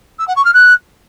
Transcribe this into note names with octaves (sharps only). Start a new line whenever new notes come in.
E6
F#5
C#6
F6
F#6